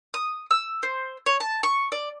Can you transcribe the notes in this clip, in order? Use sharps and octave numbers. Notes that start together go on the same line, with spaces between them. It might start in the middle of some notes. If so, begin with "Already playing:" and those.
D#6
E6
C5
C#5
A5
C#6
D5